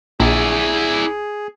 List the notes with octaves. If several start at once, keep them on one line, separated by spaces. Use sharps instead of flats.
A#1 E4 G#4 D5